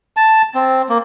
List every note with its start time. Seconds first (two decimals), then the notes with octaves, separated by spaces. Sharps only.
0.17 A5
0.55 C4
0.90 A#3